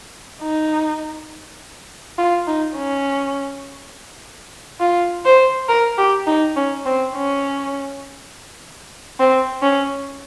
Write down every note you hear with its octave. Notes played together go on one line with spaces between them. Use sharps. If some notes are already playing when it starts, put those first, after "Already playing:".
D#4
F4
D#4
C#4
F4
C5
A#4
G4
D#4
C#4
C4
C#4
C4
C#4